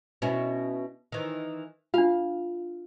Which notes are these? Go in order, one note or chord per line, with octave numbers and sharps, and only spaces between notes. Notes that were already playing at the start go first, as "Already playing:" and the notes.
B2 C#4 E4
D#3 E3
D4 F4 F5